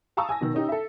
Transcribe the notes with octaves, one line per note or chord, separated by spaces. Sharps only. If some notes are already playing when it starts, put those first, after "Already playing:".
F5 A5 A#5 C#6 D#6 E6
G#5 E6 A#6
B2 D#3
C#4 D#4 G4
A4 E5